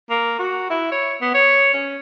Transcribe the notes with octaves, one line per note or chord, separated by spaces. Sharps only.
A#3
F#4
E4
C#5
B3
C#5
C#4